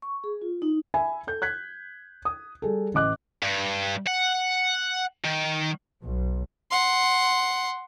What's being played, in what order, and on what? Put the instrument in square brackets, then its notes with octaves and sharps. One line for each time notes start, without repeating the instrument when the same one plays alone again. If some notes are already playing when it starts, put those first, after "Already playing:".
[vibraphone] C#6
G#4
F4
D#4
[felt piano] E5 G#5 B5
A4 G6
F#6 G#6 B6
D#6
G3 G#4 A4
A1 D#5 D6 F#6
[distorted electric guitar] G2
F#5
D#3
[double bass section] B1
[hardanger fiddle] F#5 C6